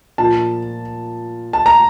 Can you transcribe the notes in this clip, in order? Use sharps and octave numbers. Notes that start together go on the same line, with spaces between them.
A#2 F3 A5
A5
A#5